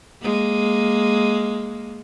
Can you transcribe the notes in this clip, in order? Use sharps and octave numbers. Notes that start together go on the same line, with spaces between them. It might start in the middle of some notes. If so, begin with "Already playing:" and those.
G#3 A#3